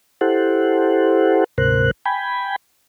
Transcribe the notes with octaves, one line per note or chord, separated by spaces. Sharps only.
E4 G4 A4 C5 F#5
D2 G#2 C3 A#4 C5 F#6
G5 G#5 B5